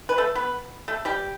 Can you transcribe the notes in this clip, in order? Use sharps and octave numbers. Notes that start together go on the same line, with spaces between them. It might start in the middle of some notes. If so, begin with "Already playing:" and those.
B4
A3 A4
B3 B4
A3 A4
G3 G4